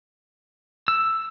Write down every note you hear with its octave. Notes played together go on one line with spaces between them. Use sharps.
E6